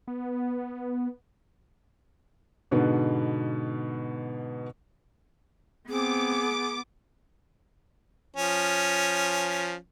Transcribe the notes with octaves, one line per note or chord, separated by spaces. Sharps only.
B3
G#2 B2 D3 B3
B3 C4 G#4 D6
F3 C#4